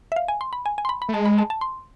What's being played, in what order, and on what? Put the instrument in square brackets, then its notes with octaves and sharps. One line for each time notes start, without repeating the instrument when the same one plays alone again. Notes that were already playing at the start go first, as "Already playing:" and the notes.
[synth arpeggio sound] E5
F5
G#5
C6
B5
G#5
G#5
C6
B5
B5
[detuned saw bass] A3
[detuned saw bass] G#3 [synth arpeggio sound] A5
[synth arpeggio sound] B5
A5
A5
C6